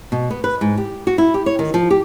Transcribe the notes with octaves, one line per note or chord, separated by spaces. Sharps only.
B2
B3
B4
G#2
G4
F#4
E4
G4
C#5
D#3
F3
G4